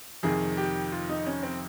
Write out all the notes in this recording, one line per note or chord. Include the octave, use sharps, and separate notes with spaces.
F2 C3 D#3 G#4
G4
F4
D#4
C#4
C4